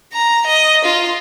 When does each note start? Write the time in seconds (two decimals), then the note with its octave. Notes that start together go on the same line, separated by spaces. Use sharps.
0.13 A#5
0.47 D#5
0.85 F4